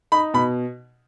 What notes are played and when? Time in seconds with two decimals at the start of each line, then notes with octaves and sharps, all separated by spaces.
0.12 D#4 B5
0.34 B2 B5